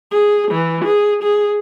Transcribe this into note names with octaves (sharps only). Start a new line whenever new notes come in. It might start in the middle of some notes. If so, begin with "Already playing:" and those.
G#4
E3
G#4
G#4